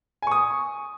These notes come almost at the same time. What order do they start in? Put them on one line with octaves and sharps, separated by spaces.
G#5 C#6 D#6